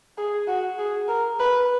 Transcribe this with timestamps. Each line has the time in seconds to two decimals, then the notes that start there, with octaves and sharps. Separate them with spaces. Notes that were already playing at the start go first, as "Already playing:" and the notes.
0.18 G#4
0.48 F#4
0.79 G#4
1.09 A#4
1.39 B4